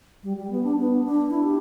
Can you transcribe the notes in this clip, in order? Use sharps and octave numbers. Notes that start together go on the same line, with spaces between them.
G3
G3
B3
D4
B3
D4
E4
G4